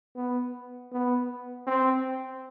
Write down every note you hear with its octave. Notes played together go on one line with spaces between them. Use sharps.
B3
B3
C4